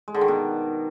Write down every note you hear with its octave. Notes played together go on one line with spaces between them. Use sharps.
G#3
D3
D#3
B2